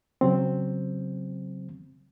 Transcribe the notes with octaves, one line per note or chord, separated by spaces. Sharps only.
C#3 F#3 C4